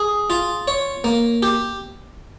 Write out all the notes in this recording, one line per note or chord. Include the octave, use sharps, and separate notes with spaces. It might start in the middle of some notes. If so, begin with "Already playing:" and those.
Already playing: G#4
F4
C#5
A#3
G4